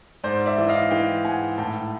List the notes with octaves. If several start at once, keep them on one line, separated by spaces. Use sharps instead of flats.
G#2 C5 D5
D5 E5
E3
D#5 F5
E3 F5 G5
G#2 F#5 G#5
A2 G5 A5